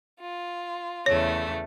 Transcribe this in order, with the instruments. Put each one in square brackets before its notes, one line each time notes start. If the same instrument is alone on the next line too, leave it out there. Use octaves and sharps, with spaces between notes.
[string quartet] F4
[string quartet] E2 C#3 A3 [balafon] C#5